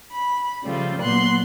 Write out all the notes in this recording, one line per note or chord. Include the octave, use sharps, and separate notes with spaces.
B5
C#3 F3 G3 A3 F4
A#2 F#3 B3 C6 F#6